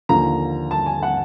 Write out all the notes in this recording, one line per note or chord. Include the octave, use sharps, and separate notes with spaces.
D#2 D3 F3 A#5
A5
G#5
F#5